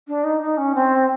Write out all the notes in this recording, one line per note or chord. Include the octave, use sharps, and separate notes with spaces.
D4
D#4
D#4
C#4
C4